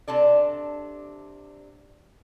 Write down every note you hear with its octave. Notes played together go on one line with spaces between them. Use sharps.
C3 D4 A4 D5